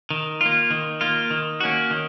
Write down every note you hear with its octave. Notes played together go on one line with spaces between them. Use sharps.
D#3
A#3 F4
D#3
A#3 F4
D#3
A#3 C#4 F#4
D#3